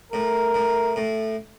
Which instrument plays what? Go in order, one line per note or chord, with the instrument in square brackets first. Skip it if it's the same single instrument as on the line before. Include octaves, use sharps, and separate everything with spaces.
[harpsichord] A2 [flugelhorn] A#4
[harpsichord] A2
A2